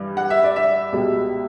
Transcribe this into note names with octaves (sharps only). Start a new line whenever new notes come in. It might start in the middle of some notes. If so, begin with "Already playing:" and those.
Already playing: G2 E3 G3
F#5
E5
D5
E5
C#2 B2 G3